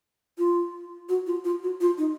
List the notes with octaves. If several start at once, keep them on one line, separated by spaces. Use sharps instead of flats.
F4
F#4
F4
F4
F#4
F4
D#4